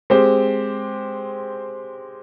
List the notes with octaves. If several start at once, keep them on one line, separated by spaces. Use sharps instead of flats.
G#3 C4 G4 C5